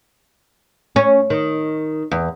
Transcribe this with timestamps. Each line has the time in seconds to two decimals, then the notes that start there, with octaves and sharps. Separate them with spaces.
0.96 C#4
1.30 D#3
2.11 E2